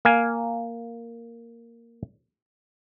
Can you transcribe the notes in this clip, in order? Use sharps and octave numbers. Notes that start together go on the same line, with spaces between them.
A#3 F5 G#5